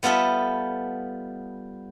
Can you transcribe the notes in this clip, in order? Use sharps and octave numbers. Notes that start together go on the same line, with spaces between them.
G3 B3 F4 A4 E5